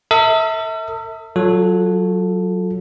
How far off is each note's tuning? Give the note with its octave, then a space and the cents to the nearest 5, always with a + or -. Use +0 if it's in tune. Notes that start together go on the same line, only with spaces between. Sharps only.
A4 +45 E5 -30 D#6 +0
F#3 +0 F4 +30 A4 +0